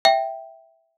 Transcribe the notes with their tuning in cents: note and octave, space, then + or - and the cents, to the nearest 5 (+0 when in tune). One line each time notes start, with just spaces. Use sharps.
E5 +0 G5 +0